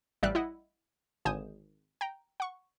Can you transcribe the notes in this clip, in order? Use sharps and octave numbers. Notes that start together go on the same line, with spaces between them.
A1 G3 D5 E5 F6 F#6
E4 D#5 F#5
G#1 D3 G#5 D#6 G6 E7
G5 A#5
F#5 C#6